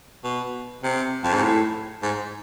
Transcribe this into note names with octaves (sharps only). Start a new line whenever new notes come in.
B2
C3
F2
G#2
A2
G#2